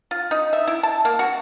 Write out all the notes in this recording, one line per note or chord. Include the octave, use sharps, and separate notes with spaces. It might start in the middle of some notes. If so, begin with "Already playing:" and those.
F4
D#4
E5
E4
A5
A#3
F#4